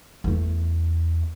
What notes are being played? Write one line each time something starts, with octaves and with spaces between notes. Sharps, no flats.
E2 A3